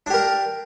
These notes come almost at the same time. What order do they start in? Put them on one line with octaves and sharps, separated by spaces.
D4 G4 A#4